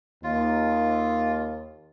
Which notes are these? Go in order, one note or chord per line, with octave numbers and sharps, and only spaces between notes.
D#2 F4